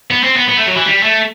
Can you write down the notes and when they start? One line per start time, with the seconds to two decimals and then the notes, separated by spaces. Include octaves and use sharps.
0.11 B3
0.23 C4
0.36 B3
0.48 B3
0.57 A3
0.66 F#3
0.76 E3
0.86 G3
1.03 A3